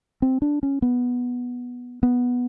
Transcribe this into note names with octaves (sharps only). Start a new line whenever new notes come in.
C4
D4
C#4
B3
B3